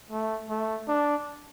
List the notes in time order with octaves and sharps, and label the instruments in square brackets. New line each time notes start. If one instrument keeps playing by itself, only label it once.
[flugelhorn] A3
A3
D4